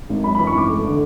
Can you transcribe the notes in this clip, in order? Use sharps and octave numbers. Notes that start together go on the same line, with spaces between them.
G#1
F#2 B5
E3 B5
C#6
G#1 D6
A3
D3